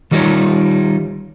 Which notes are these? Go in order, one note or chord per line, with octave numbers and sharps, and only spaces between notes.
D#3 G3 D#4 F4 C#5